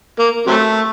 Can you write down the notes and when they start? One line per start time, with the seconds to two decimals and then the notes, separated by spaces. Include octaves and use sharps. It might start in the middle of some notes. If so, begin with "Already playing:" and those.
0.19 A#3
0.47 C3 F#3 A3